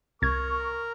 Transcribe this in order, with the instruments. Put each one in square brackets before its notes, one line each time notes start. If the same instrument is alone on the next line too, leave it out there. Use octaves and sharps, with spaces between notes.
[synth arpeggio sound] C2 G#6 [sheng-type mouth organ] A#4 A#5 [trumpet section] C#6